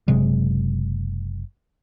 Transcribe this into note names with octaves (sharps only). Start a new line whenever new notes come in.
F#1 C3 F#3 G#3